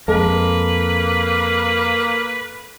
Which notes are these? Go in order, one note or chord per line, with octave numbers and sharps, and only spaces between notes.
F2 G#3 A#3 A4 B4